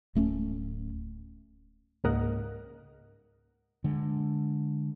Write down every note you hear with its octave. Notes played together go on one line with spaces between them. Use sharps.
D1 A3 B3 C#4
C#2 G#2 A#3 A#4 D#5 F#5
D3 G#3